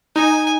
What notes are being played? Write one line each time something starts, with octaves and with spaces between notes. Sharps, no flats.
D#4 G#5